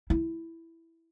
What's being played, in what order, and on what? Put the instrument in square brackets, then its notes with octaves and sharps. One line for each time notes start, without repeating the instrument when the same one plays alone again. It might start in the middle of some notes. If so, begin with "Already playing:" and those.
[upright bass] E4